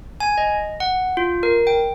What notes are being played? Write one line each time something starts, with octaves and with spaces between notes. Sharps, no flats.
G#5
D#5
F#5
F4
A#4
G5